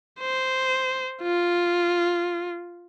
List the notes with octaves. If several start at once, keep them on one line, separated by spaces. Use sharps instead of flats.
C5
F4